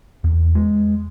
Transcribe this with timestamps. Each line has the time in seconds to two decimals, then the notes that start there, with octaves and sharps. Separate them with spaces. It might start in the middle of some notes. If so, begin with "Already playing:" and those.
0.24 E2
0.55 G#3